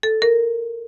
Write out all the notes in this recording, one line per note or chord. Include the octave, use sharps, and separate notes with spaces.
A4
A#4